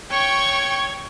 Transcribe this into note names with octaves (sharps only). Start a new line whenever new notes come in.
C#5 G5 C#6 G#6